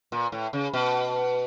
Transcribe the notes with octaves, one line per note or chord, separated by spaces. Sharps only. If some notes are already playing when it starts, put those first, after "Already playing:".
A#2
A2
C#3
B2